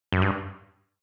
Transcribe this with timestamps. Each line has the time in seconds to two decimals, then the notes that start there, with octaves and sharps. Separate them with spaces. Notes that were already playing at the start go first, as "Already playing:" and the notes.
0.12 F#2
0.22 G2